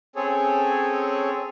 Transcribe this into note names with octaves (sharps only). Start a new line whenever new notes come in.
C4 C#4 G#4 A4 C#5